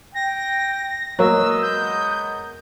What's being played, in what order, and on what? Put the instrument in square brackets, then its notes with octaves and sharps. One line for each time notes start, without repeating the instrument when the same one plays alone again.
[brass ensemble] G5 [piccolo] A#6
[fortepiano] F#3 A#3 [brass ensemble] G#3 B3 D#5 [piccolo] E6
[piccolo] G6